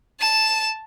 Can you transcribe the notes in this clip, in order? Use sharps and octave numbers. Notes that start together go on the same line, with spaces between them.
A5 E7